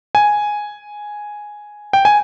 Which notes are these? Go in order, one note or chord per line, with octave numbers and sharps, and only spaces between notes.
G#5
G5
G#5